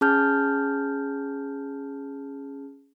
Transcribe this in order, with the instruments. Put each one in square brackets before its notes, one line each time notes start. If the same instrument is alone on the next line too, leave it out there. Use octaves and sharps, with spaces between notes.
[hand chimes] C#4 G#4 A5 F6 G6